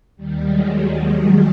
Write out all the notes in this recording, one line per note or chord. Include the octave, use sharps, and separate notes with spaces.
D#2 D#3 G3
F#3 G#3